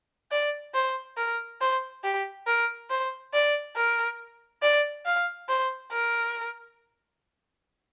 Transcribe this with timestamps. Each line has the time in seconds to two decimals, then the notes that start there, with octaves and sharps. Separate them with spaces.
0.31 D5
0.74 C5
1.17 A#4
1.61 C5
2.04 G4
2.47 A#4
2.90 C5
3.33 D5
3.76 A#4
4.63 D5
5.06 F5
5.49 C5
5.92 A#4